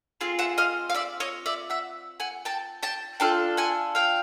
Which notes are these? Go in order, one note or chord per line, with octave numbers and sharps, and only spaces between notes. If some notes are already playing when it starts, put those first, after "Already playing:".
C4 F4 G#4
E5 F#5
D#5 F5
F5
D5 E5
C#5 D#5
D5 E5
E5 F#5
F#5 G#5
G5 A5
G5 A5
D4 F4 A4 G5 A5
F#5 G#5
F5 G5